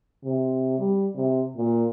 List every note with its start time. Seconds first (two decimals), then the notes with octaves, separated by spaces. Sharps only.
0.24 C3
0.78 G3
1.14 C3
1.56 A#2